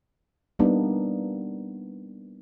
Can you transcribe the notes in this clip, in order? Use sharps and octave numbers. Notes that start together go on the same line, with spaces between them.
G3 A#3 B3 D4 D#4